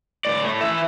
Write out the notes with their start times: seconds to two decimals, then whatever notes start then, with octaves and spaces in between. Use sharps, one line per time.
0.25 A2 D5
0.44 A3
0.61 E3 E5